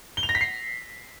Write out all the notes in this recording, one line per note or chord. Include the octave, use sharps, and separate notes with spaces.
G7
F7
A#6
B6
C7